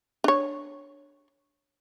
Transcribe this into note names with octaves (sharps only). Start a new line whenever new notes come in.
D4 C#5